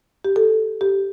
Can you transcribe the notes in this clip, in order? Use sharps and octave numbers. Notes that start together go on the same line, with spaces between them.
G4
A4
G4